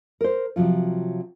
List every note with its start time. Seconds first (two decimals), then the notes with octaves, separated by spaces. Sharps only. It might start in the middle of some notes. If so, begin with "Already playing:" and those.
0.21 A#4 C5
0.56 C3 F3 F#3 F4